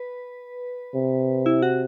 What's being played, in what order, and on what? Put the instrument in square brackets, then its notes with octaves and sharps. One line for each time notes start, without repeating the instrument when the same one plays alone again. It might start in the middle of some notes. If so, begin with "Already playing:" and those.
Already playing: [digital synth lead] B4
[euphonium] C3
[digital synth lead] E4
F#4